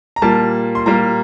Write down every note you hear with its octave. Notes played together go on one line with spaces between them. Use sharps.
A#5
A#2 G3 A#3 A5
C6
A#2 G3 A#3 A#5